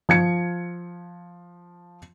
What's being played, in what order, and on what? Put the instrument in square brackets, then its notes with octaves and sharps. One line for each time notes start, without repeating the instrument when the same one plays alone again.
[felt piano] F3 G#6 C#7